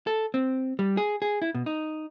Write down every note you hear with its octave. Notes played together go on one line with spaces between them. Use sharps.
A4
C4
G3
G#4
G#4
E4
B2
D#4